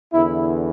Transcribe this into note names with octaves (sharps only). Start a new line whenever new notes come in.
E2 D3 E4